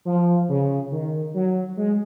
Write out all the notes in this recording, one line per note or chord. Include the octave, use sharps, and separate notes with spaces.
F3
C#3
D#3
F#3
G#3